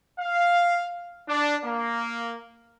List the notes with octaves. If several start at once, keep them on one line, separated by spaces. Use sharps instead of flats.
F5
D4
A#3